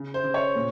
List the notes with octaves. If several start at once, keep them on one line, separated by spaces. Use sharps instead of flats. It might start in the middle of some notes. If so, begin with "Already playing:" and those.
Already playing: C#3
C5
C#3
C#5
A#2